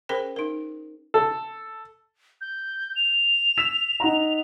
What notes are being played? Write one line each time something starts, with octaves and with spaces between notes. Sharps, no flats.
C#4 G#4 A#4 C5 G5
D#4 A#4
A4
G6
F7
E6 B6 E7
D#4 F#5 A#5